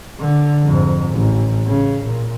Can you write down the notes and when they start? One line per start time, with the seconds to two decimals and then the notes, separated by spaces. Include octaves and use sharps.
0.20 D3
0.63 F2 G#2
1.11 A1
1.67 C#3
2.05 A#2